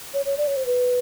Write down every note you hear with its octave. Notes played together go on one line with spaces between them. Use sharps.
C#5
C#5
D5
C#5
C5
B4